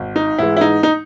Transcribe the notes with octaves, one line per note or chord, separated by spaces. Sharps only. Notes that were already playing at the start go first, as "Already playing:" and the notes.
Already playing: G#1
D#4
G#2 E3 G#3 E4
E4
D#4
D#4